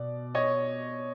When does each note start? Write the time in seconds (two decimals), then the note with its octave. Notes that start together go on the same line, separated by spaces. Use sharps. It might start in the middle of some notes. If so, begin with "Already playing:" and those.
Already playing: B2 D5
0.35 C#5 D#5